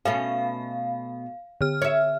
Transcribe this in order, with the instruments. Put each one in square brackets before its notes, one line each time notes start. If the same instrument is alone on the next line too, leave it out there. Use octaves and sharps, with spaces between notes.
[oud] B2 A3 C#4 [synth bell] F5
[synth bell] D3 F6
[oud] C#5 E5